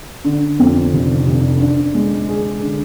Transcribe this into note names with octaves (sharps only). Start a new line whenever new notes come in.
D3
F2
F1
F1
D4
G#3
G#4
D3